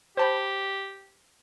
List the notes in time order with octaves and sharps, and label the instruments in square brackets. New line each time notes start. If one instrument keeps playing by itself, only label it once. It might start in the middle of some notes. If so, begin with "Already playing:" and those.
[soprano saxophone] G4 [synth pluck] C5 A5 B5